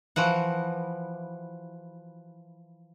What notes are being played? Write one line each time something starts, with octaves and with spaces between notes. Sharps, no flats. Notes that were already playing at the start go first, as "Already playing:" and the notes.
E3 F3 F#4 F#5